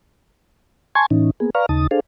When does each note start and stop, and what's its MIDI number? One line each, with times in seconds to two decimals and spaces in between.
0.95 1.06 80
0.95 1.06 81
0.95 1.06 84
0.95 1.06 85
0.95 1.06 92
1.11 1.31 45
1.11 1.31 52
1.11 1.31 61
1.11 1.31 63
1.40 1.50 58
1.40 1.50 59
1.40 1.50 68
1.55 1.66 71
1.55 1.66 74
1.55 1.66 77
1.55 1.66 82
1.55 1.66 85
1.55 1.66 89
1.69 1.87 39
1.69 1.87 49
1.69 1.87 63
1.69 1.87 81
1.69 1.87 87
1.91 2.00 62
1.91 2.00 68
1.91 2.00 69
1.91 2.00 72
1.91 2.00 77